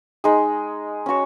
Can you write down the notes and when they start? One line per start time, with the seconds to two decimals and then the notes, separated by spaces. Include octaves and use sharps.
0.24 G#3 D#4 G#4
1.06 C#4 F#4 C#5